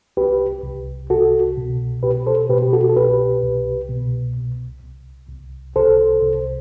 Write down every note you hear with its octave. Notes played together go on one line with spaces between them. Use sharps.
C2 G4 B4
C2
C2 F#4 A4
B2
B2 G4 B4
A4 C5
B2 G4 B4
G4
F#4 A4
A4
C2 G4 B4
C2
B2
C2
C2
C2
C2 A4 C5
C2